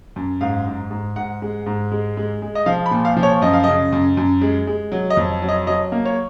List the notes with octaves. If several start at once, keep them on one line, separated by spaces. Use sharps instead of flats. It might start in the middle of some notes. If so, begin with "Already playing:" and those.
F#2
G#2 F5
G#2
G#2
G#2 F#5
G#3
G#2
G#3
G#3
G#3
D#5
F3 F5
B5
A#2
F5
F3
C#5
F#2 D#5
F5
C#3 D#5
F#2
F#2
G#3
G#3
F#3
D#5
F2
F#3
D#5
F#3 D#5
A#3
C#5